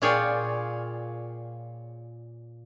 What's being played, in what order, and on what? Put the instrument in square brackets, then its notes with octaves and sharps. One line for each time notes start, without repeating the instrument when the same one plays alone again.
[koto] A#2 F4 G#4 C#5 D5 G5